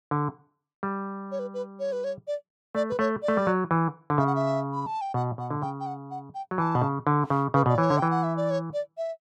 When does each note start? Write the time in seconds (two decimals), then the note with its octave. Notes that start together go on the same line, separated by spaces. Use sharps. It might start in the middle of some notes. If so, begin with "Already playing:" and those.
0.11 D3
0.83 G3
1.31 C#5
1.39 B4
1.54 B4
1.80 C#5
1.92 B4
2.04 C#5
2.27 D5
2.75 A3 D5
2.89 B4
2.99 A3 C#5
3.22 D5
3.28 A3
3.37 G3
3.47 F#3
3.71 E3
4.10 D3
4.18 C#3 E5
4.26 F#5
4.36 E5
4.73 B5
4.87 A5
5.01 G5
5.14 B2 F#5
5.38 B2 F#5
5.51 D3
5.62 C#3 G5
5.80 G5
5.86 F#5
6.11 F#5
6.35 G5
6.51 F#3
6.58 E3 A5
6.75 B2
6.82 C#3
7.07 D3
7.30 C#3
7.54 C#3 B4
7.66 B2 D5
7.78 E3 C#5
7.90 D3
7.98 E3 G5
8.10 F#5
8.23 E5
8.37 D5
8.50 C#5
8.73 D5
8.98 E5